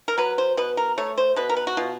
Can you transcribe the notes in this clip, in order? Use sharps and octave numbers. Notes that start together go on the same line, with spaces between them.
A#4
F#3 B4
C5
B2 B4
A#4
A3 C#5
C5
B2 B4
A#4
B4
F#4
B2 F4